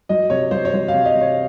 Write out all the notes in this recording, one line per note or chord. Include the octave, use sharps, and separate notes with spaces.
F#3 D#5
C3 C#5
F#3 C5
C#5
F#3 C5
F5
C3
D#5
C3
C#5